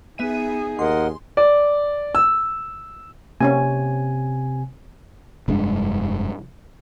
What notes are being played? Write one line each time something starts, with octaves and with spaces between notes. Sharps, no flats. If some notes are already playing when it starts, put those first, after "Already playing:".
B3 D#4 G#4 E5 D#7
D#2 A#4 D#5 F#5 C6
D5
E6
C3 A#3 C4 C#4 G#5
F1 G2 G#3 D4